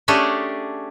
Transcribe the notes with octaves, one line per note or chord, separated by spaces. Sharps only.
A3 C#4 D4 G4 G#4